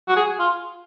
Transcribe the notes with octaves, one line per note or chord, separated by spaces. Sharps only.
F#4
G#4
F4